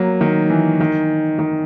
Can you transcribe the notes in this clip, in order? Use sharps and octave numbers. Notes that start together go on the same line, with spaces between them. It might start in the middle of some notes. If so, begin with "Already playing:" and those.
Already playing: F#3 A#3
D#3
E3
D#3
D#3